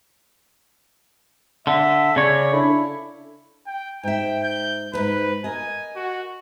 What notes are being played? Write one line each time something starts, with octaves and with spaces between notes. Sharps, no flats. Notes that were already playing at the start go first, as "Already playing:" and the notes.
D3 E5
C#3 C#5 D5
D4 E4 A4
G5
G#2 E5 G5
G6
E2 G#2 B4
A#4 D#5 G#5
F#4